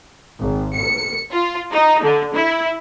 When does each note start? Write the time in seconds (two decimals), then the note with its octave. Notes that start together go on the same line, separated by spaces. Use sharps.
0.41 G#1
0.76 C#7
1.30 F4
1.72 D#4
2.03 D3
2.33 E4